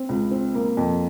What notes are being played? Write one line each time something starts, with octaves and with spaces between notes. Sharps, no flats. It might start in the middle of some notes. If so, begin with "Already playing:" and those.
Already playing: C4
C#2
C4
A#3
F2